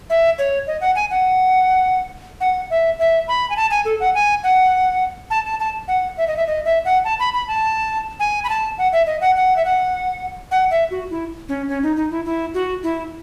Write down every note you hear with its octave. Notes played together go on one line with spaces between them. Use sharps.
E5
C#5
D#5
F#5
G#5
F#5
F#5
E5
E5
B5
G#5
A5
G#5
A4
F#5
G#5
F#5
A5
A5
A5
F#5
E5
D#5
E5
D#5
E5
F#5
A5
B5
B5
A5
G#5
B5
A5
F#5
E5
D#5
F#5
F#5
E5
F#5
F#5
E5
F#4
E4
C#4
C#4
D#4
D#4
E4
E4
F#4
E4